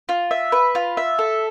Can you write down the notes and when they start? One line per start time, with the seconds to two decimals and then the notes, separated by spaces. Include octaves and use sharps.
0.09 F4
0.31 E5
0.52 B4
0.75 F4
0.97 E5
1.19 A4